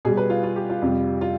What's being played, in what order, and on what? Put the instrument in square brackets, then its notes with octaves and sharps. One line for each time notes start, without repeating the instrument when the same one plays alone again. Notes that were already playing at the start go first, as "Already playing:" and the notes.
[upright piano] B2 G3 G#4
B4
F4
F4
G4
F4
F2 C3 G3
F4